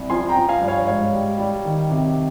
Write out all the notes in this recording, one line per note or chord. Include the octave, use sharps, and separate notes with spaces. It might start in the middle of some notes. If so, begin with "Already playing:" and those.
Already playing: C2
F3 G#5 C6
G5 A#5
F3
F5 G#5
G2
C#5 F5
G#2 C#5 F5
G3
G3
D#3
C3